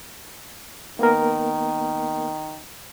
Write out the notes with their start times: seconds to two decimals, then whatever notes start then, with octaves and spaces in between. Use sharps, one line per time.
0.99 D#3 A#3 B3 A#4